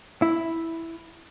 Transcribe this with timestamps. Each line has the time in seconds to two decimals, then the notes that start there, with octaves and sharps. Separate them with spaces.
0.22 E4